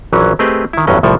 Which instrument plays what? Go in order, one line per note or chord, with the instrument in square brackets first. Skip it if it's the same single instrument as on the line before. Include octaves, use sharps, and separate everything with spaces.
[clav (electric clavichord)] A#1 E3 F#3 C#4
A3 C4 G4 G#4 B4 D#5
D#3 E4
A1 E2 G2 F#3 C#4 D#5
C2 A2 F3 A4 G#5